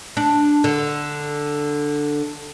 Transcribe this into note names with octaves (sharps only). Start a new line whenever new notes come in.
D4
D3